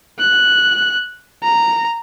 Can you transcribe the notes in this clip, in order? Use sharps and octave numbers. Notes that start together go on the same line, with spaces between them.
F#6
A#5